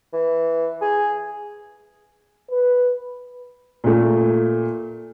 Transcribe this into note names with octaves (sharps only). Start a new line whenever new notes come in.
E3
G#4
B4
A#2 A3